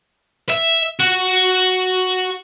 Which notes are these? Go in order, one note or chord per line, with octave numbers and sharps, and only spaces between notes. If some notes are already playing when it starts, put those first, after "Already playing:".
E5
F#4